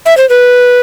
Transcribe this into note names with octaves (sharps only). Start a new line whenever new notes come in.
E5
C5
B4